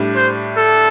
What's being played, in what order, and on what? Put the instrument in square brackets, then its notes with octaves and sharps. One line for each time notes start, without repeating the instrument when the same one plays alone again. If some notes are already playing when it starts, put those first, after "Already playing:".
Already playing: [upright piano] A2 G3 D4
[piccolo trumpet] C5
A4